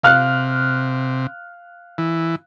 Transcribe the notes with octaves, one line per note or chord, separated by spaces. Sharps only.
C3 F5 F6 F#6
E3